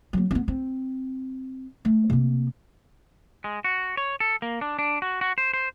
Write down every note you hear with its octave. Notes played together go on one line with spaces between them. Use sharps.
F#3 A#3
B3 C#4
C4
A3
C3 A#3
G#3
F#4
C#5
A4
A#3
D4
D4
F#4
F#4
C5
C5